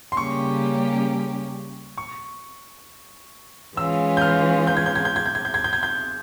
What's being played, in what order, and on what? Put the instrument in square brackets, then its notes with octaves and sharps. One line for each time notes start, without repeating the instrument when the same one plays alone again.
[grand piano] C6
[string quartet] C#3 G3 A#3 C#4 G4 [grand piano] C#6
[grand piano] C#6
[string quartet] E3 G#3 C#4 F4 [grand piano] E6
[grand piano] G6
F6
G6
G#6
G6
G#6
G6
G#6
G6
G#6
G6
G#6
G6
G#6
G6